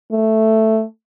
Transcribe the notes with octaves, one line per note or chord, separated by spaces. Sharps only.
A3